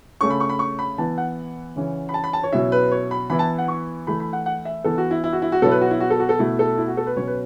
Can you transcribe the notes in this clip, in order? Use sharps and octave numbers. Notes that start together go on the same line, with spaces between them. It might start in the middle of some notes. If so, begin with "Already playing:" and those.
C#3 A3 C#4 C#6
B5
C#6
B5
C#6
B5
E3 B3 E4 A5
F#5
C#3 E3 C#4
B5
A5
B5
A5
C#5
B2 F#3 C#4 E4 E5
B4
C#5
B5
E3 B3 E4 B5
A5
F#5
C#6
E3 A3 E4 B5
B5
F#5
F#5
E5
E3 B3 E4 A4
F#4
E4
E4
F#4
E4
F#4
B2 F#3 B3 E4 A4
B4
F#4
E4
F#4
A4
F#4
A4
B2 A3 E4
A4
E4
F#4
A4
B4
B2 F#3 C#4 C#5
B4